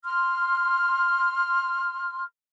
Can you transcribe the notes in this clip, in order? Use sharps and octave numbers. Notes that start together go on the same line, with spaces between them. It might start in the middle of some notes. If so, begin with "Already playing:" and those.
C6 F6